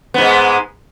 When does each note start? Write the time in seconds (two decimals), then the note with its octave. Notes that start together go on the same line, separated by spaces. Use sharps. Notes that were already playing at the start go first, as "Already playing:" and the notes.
0.14 B3
0.18 G#2
0.22 G#3